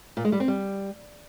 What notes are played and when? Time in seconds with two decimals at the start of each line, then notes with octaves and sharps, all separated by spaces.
0.17 A#2
0.25 G#3
0.32 G3
0.40 C4
0.48 G3